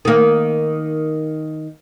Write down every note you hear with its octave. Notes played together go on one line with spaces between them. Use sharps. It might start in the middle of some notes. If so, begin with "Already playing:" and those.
D#3 A#3